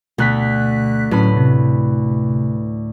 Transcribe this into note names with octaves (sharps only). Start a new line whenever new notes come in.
D2 B2 F#6 B6
A2 F#3 C#4 B4 B5
C3